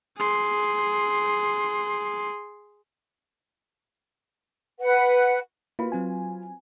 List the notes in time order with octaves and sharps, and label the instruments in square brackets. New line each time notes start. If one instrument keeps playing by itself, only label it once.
[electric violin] G#4 C6
[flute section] B4 F#5
[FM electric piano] A#3 B5 [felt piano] F4 F#4 B4
[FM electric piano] F#3 C4 G#5